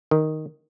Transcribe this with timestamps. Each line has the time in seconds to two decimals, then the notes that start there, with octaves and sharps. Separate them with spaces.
0.11 D#3